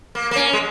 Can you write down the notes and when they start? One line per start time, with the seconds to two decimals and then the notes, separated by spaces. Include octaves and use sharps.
0.15 A#3
0.31 A#3
0.36 C#4
0.53 G#3